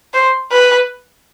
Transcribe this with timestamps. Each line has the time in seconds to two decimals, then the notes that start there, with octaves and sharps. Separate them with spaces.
0.14 C5
0.52 B4